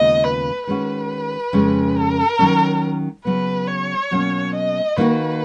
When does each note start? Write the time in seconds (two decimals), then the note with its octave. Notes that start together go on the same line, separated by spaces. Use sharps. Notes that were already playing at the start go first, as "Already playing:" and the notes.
Already playing: D#2 C#3 G#3 B3 F4 D#5
0.24 B4
0.67 D#3 G#3 C#4 F#4 B4
1.53 F2 C#3 G#3 C#4
1.97 A#4
2.39 D#3 F#3 C#4
3.25 C#3 F#3 B3 B4
3.68 C#5
4.11 B2 F#3 A#3 C#4
4.54 D#5
4.97 D#3 A#3 D#4 F#4 B4